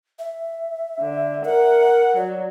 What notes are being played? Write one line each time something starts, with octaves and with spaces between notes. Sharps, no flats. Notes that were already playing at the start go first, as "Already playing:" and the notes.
E5
D3
A#4 F#5
F#3 D5